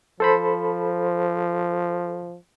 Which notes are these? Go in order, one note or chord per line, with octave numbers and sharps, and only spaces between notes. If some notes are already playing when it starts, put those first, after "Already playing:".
F3 A4 C5 B5